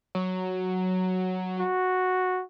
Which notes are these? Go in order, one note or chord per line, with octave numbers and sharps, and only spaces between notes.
F#3
F#4